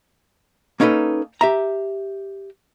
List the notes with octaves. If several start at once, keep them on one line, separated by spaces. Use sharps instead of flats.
A#3 C#4 D#4 A4 B4
G4 E5 A#5